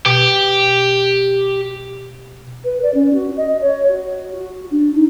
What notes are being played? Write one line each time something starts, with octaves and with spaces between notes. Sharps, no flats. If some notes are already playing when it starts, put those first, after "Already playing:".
B2 G4
B4
D5
C#4
F#4
D#5
C#5
F#4
F#4
D4
D#4